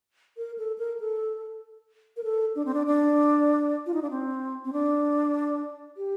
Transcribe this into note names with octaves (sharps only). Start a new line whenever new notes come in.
A#4
A4
A#4
A4
A#4
A4
D4
C4
D4
D4
F4
D#4
D4
C4
C4
D4
G4